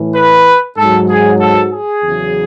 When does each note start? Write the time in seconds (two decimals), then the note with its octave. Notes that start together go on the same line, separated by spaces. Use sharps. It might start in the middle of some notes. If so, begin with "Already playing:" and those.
Already playing: A2 E3
0.15 B4
0.77 G#2 F#3 A4
1.10 G#4
1.40 A4
1.73 G#4
2.03 E2 C#3 F#3